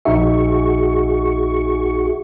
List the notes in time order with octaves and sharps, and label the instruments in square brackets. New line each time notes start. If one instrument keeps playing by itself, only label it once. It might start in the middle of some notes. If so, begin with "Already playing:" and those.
[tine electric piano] A#1 D#4 E5 [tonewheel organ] F#4 G#4 C#6